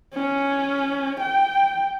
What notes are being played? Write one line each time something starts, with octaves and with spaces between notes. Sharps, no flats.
C#4
G5